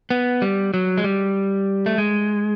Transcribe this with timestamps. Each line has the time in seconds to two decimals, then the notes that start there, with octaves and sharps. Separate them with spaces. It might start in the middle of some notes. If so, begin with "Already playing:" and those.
0.10 B3
0.42 G3
0.74 F#3
0.98 G#3
1.04 G3
1.86 A3
1.98 G#3